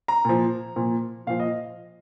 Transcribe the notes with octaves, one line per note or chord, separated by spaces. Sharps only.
A#5
A#2 F3
A#2 F3
A#2 F3 F5
D#5